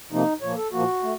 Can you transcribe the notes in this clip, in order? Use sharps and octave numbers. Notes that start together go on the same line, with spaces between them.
C3 F3 A#3 D#4
A#2 F3 A#3 C#5
A4
A#2 F3 A#3 F#4
A3